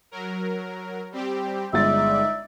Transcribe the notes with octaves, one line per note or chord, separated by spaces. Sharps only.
F#3 A#4
G3 C4 G4
G1 G#3 D#4 D5 E5 A6